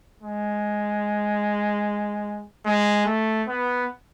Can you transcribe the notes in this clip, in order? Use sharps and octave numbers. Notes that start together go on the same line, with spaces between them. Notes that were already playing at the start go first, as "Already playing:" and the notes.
G#3
G#3
A3
B3